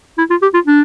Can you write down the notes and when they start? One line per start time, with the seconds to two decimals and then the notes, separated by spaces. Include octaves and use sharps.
0.18 E4
0.30 F4
0.42 G4
0.54 F4
0.67 D4